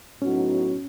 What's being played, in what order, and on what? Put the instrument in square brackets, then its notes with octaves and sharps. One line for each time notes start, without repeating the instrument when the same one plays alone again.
[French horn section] A2 F#3 B3 D#4 F#4 [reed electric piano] C#4